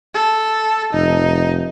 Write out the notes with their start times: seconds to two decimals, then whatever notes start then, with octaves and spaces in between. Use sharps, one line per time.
0.14 A4
0.93 F1 D#4